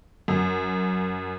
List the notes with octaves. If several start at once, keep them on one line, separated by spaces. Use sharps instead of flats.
F#2